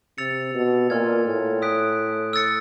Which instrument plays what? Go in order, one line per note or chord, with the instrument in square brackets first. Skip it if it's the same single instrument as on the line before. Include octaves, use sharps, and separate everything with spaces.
[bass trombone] C3 [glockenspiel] E6 A6 C#7 F7
[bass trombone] B2
[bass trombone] A#2 [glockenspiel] G#5 C6 F6 G#6
[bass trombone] A2
[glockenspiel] D#6 F#6 B6 D7
E6 A6 C#7